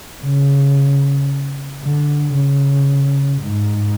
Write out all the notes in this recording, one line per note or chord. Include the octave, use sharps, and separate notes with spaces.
C#3
D3
C#3
G#2